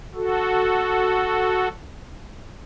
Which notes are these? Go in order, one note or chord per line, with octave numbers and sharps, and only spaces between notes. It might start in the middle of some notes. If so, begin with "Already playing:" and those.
F#4 A4